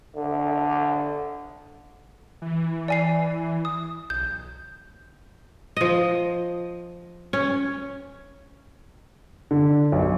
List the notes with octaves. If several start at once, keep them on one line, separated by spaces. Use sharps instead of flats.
D3
E3
D5 G#5 C7
D#6
B1 G6
F3 D#5
C#4
D3
B1